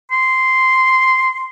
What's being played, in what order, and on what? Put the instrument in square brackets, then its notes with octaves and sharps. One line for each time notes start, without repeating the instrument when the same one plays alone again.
[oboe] C6